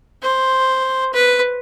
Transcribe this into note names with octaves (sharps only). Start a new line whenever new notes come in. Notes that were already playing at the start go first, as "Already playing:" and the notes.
C5
B4